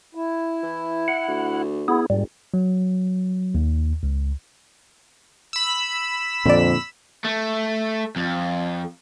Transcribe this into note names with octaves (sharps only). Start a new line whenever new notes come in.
E4
E3
F#5
D2
B3 E4 G#4
F#1 G#2 G3
F#3
D#2
C#2
B5 E6
F2 A#2 D3 C4 D5
A3
F2